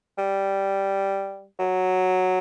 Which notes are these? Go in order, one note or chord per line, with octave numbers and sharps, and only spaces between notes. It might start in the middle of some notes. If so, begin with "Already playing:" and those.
G3
F#3